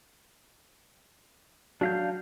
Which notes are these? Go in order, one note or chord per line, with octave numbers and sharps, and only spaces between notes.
F#3 D4 F5 G6